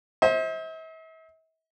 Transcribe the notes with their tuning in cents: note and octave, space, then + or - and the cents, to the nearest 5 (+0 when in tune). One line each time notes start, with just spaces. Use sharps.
C5 +20 E5 -45